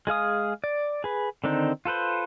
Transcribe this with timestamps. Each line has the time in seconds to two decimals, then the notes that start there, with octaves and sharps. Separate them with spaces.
0.07 G#3 G#4 F5 D#6
0.64 D5
1.04 G#4 B4
1.44 D3 D#3 C4 D4 D#4
1.85 F4 A4 B4 C5